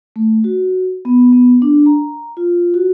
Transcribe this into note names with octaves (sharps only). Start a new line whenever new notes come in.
A3
F#4
B3
B3
D4
A#5
F4
F#4